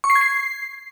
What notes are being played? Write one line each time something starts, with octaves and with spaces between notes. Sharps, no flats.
C#6
C7
G#6
C7